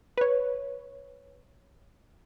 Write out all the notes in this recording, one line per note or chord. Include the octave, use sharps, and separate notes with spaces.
B4 C#5